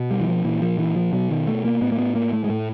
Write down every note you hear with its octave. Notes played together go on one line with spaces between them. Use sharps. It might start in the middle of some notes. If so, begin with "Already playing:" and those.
Already playing: B2
G3
E3
F3
A#2 E3
F3
E3
F3
B2 F#3
D#3
A3
A#3
A2 B3
A#3
B3
A#3
A3
G#3
A2 A3